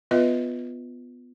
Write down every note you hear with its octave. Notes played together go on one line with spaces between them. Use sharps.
B3 F4 B4 D#5 E5